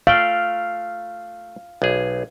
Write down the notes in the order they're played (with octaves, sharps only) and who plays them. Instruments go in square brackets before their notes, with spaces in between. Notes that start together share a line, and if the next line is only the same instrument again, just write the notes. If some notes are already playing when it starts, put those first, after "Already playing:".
[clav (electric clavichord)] A3 D5 G5 [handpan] F5
[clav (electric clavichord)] B1 G#4